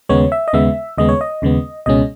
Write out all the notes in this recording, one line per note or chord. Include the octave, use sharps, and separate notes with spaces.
D#2 C#3 G#3 B3 C#5
E5
D#5
D#2 C#3 G#3 B3 E5
D#2 C#3 G#3 B3 D#5
C#5
D#5
D#2 C#3 G#3 B3
C#2 B2 G#3 C#4 D#5